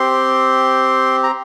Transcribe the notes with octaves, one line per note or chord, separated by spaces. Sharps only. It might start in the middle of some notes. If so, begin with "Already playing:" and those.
Already playing: C4 G4 C6
A#5